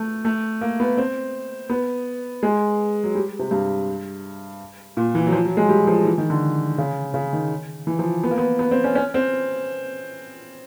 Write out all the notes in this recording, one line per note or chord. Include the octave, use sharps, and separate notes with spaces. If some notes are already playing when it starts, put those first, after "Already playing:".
Already playing: A3
A3
A#3
B3
C4
B3
G#3
F#3
G3
C3
G2
A#2
E3
F#3
F3
F#3
G#3
G3
F3
E3
D#3
D3
C#3
C#3
D#3
E3
F3
B3
A#3
B3
B3
C4
C#4
C#4
C4